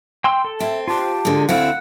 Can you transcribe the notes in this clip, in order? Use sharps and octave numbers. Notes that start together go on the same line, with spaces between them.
G5 C6 E6
A4
C4 E5
F4 G4 A5
D3 G#3
D2 C4 E4 F5 F#5